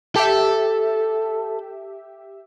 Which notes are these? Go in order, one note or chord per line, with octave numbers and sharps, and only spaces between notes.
G4 A4 E5